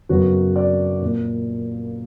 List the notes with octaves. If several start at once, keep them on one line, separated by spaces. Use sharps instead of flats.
F#2 C#3 F#3 B3 F#4
D5
A#2 A#3